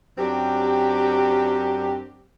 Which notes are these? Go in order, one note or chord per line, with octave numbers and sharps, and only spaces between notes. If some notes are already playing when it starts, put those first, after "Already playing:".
F#2 C4 D4 G4